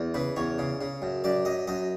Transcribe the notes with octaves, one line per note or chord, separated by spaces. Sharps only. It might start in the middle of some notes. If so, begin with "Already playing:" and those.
Already playing: E2
C#3 B4
E2 C#5
C#3
C#3
F#2
F#2 D5
F#2 D#5
F#2 D#5